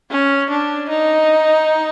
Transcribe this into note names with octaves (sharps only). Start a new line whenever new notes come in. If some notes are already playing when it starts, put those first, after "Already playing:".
C#4
D4
D#4